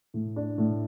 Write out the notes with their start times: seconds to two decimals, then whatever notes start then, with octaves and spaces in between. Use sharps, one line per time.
0.14 A2
0.36 D4
0.58 A2